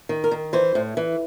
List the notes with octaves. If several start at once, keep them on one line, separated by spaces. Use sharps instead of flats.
D#3
A#4
D#3
E3 C5
A2
E3